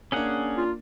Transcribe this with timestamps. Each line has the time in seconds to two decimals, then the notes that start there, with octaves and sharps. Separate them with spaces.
0.12 A#3 C#4 D4 G#4 F#5
0.57 F4